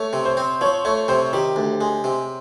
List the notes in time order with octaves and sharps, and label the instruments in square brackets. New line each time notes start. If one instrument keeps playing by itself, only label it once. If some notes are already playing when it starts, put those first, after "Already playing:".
Already playing: [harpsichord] A3 [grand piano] C#5
[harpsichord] C3
[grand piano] C5
[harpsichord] C4
[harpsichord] F3 [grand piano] C#5
[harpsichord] A3 [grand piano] C#5
[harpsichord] C3 [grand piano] C5
[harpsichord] D#3 [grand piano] G4
[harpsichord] D2
G#3
C3